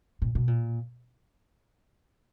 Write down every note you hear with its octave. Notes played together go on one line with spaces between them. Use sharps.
A#2
B2
A#2